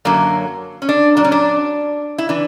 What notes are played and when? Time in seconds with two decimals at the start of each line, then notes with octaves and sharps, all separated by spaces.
0.05 F#2 D3 F#3 A#3
0.82 C#4
0.89 D4
1.17 A#2 F#3 D4
1.24 C#4
1.32 D4
2.18 E4
2.29 E3 D4